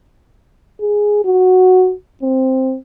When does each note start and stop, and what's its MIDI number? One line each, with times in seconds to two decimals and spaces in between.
0.81 1.20 68
1.25 1.93 66
2.22 2.77 60